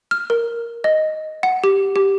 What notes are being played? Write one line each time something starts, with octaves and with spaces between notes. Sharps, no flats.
F6
A#4
D#5
F#5
G4
G4